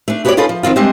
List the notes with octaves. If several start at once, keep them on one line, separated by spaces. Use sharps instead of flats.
A3 D4
B3 F#4 G4 A4 C#5 D5
C#4 D#4 F4 G#4 A4 B4
F3
D#3 F3 C4 F4
G3 G#3 C4 D4 D#5